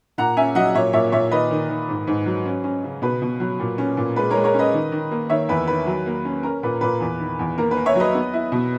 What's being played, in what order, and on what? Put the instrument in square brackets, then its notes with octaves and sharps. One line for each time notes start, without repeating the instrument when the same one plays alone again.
[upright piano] A#2 F#5 A#5
C#4 E5 G#5
F#3 D#5 F#5
A#2 C#5 E5
A#2 C#5 E5
A#2 C#5 E5
D#3 B4 D#5
D#3
D#3
G#2
G#2
F#3
C#4
C#4
C#3
B2 B4
B2
F#3
A#2
C#4
A#2
G#3 B4
A#4 C#5
G#3
A#4 C#5
C#4 B4 D#5
D#3
D#3
A#3
D#3 C#5 E5
E2 B4
D#3 B4
F#3
A#3
C#4
C#4 A#4
A#2 B4
A#2 B4
E2
D#3
E2
A#3 A#4
B4
A#3
C#5 E5
F#3 B4 D#5
B3
E4
B2